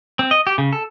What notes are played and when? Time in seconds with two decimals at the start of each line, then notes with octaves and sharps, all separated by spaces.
0.19 C4
0.31 D#5
0.47 G4
0.58 C#3
0.73 A4